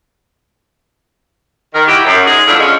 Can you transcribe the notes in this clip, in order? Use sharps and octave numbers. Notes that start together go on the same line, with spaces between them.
D#3 A#4
E4 F#4 G4
F#2
G#3 D#4 G#4
F3 F#3 A3 B3 D4 E4
F3 G#3 C#4